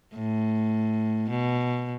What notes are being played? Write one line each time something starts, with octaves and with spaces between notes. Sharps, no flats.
A2
B2